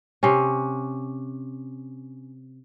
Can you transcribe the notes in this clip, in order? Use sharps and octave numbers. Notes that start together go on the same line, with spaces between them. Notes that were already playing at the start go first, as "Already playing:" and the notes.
C3 C#4